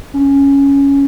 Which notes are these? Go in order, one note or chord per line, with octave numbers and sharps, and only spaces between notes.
C#4